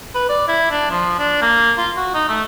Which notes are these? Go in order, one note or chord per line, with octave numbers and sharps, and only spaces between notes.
B4
D5
E4
D4
F3
D4
A#3
F4
F#4
D#4
A3